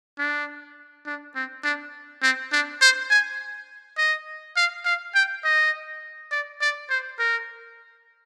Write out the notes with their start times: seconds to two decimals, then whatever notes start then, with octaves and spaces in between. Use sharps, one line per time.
0.18 D4
1.06 D4
1.35 C4
1.64 D4
2.22 C4
2.52 D4
2.81 C5
3.10 G#5
3.98 D#5
4.56 F5
4.85 F5
5.15 G5
5.44 D#5
6.31 D5
6.61 D5
6.90 C5
7.19 A#4